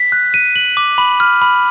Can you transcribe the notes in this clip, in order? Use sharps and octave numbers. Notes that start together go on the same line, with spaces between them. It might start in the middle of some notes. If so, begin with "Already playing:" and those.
Already playing: B6
F#6
D#7
F#7
D6
B5
F6
B5